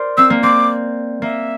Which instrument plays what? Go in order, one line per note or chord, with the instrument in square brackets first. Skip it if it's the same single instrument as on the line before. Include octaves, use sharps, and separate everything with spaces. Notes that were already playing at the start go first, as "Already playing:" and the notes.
Already playing: [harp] A#4 C5 D5
[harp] C4 [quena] E6
[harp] A#3
[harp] C4 [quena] D6
[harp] A#3 [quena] E5